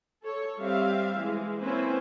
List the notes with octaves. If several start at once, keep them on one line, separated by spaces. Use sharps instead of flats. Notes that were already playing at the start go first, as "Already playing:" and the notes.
A4 C#5
G3 C4 E5 F5
E3 G#3
A#3 C4 C#4 E4 B4 C5